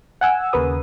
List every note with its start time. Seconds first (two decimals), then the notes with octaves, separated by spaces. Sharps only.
0.21 F#5 G#5 E6
0.53 D#2 C#3 A#4 B4 D#6